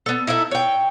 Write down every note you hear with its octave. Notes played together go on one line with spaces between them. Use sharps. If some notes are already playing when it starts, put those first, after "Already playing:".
B3 A4
D#4 E4 A4 E5
C#5 G5